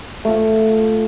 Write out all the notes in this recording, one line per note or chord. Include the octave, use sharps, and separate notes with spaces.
A3 F4